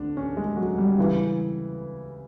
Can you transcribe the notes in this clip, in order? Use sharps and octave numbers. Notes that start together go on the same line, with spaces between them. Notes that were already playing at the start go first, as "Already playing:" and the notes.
Already playing: D2 D4
C#4
G#3
F#3
G3
C#3 E3